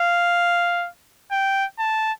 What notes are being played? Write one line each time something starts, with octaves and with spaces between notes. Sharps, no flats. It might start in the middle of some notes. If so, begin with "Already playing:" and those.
Already playing: F5
G5
A5